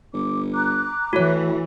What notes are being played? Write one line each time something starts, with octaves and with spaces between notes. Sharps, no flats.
G1 D6
A#5 D6 F#6
A2 E3 F#4 C#5